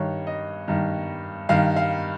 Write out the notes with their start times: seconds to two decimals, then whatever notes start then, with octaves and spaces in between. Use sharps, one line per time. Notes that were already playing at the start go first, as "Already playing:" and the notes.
Already playing: G2 D#3 C#5
0.27 D#5
0.68 G2 D#3
1.49 G2 D#3 F5
1.76 F5